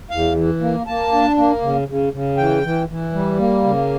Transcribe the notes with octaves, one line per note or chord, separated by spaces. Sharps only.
E2 F5
E3
A#3
A#3 A5
D4
A#3
C#3
C#3
C#3
E3 G5
E3
E3
G3
A#3
C#3